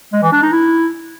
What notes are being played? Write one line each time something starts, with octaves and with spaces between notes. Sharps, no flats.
G#3
E3
D4
D#4
E4